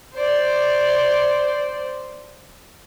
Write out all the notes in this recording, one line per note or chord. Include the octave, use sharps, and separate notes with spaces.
C5 D5